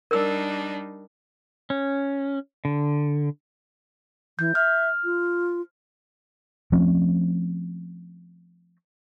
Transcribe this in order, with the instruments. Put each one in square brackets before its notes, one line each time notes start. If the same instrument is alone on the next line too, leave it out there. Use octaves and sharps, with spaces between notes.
[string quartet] G3 D4 D#4 [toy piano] A#4 E6
[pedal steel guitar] C#4
D3
[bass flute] E3 [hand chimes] G6
[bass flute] E5 [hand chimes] F6
[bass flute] F4
[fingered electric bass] F3 A3 C4 C#4